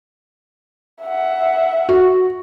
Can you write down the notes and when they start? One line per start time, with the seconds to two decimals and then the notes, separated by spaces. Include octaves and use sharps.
1.03 E5 F#5
1.89 F#4